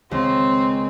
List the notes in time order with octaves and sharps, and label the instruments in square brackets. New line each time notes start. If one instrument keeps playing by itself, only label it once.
[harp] C#2 [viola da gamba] C4